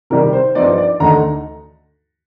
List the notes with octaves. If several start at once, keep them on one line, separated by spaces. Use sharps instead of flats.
C3 D#3 G3 A#4
C5
G2 F3 C4 D#4 D5
D5
D2 D3 A3 D#4 A#5